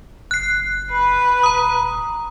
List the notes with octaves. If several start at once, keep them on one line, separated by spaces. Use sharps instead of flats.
F#1 F#6 C7
B4
D#1 A#5 D#6